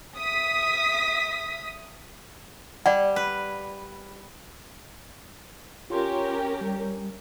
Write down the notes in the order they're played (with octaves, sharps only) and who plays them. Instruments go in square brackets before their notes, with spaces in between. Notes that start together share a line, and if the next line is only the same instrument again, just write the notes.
[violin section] E5 D#6 B6
[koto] G3 [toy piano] D5 F#5
[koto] B4
[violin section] C#4 G4 A#4 [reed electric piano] F4 C6
[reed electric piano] G3